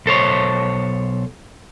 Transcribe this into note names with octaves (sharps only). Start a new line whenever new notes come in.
B1 A4 C5 C#5